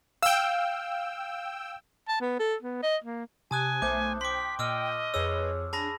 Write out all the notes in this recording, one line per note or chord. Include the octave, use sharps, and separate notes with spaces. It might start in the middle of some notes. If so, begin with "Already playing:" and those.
F5 G5 E6
A5
B3
A4
B3
D#5
A#3
C3 G#5 A5 D#6 F#6
B1 A3 C5 D6 G6
G5 C6 D6 B6
A#2 D#5 D6 E6 F6
F2 G#4 B4 C#5 E6
D4 G#4 A5 B5 A#6